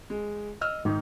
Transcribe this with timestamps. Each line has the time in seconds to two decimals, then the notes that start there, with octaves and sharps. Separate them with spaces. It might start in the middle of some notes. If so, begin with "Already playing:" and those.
0.10 G#3
0.61 D#5 E6 F6
0.85 G#2 D#3 D#4